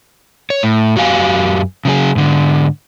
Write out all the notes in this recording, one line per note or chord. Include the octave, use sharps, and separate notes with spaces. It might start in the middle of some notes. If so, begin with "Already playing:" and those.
C#5
A2
F#2 F#4 G4 F5 G#5
C#3 F#3 G#4
G#2 D3